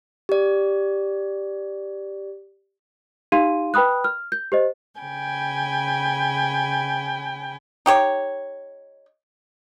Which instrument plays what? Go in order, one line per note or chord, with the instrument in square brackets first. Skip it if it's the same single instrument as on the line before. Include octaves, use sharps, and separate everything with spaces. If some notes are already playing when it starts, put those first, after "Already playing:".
[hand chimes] G4 D5
[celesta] D#4 G4 F5 C6 D#7
B4 G5 B5 D#6 F#6
F6
G6
G4 C5 D#5
[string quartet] C#3 G5 G#5 B5
[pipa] D#4 G4 C#5